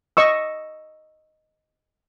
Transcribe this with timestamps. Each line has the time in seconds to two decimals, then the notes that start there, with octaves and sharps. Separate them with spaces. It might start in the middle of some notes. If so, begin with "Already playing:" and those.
0.17 D#5 C#6 E6